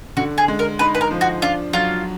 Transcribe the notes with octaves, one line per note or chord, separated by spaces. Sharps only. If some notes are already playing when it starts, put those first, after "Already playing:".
D3 F#4
G#4
G#3
A#4
D#4 B4
B4
A#4
F3
F#4
D4 F4
F#3 F4